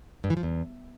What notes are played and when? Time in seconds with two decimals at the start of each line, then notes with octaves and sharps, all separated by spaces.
0.24 G2
0.30 E3
0.37 F3
0.43 E2